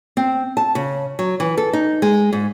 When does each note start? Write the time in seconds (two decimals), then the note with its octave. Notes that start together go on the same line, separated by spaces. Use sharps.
0.17 C4
0.57 A5
0.75 C#3
1.19 F#3
1.40 E3
1.57 A4
1.73 D#4
2.02 G#3
2.33 G#2